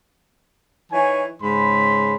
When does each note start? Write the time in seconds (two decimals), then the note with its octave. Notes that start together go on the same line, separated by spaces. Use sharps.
0.92 E3 D#4 C#5 G#5
1.41 G#2 C#3 B5 C6